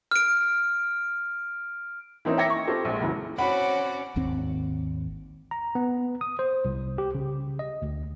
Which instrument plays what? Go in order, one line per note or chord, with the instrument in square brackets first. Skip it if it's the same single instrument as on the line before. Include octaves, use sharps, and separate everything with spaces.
[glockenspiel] F6 D7
[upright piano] E3 A#3 C4 C#4 D#4 E4
E5 G5 D6 G#6 A#6 C#7
C#6
C4 F4 G4 A4 C5
A#1 G#3
F2 C#3 E3 F#3
[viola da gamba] C4 F#4 D5 [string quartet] C#4 [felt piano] F#5 [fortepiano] B5
[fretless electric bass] G#1 D#2 C4
[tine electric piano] A#5
B3
D#6
C5
C2
G4
C#3
D#5
D2